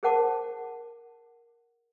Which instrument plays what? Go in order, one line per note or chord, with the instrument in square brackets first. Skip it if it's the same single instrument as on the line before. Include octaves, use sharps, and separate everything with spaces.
[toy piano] G#4 A#4 C5 F#5 A5 D6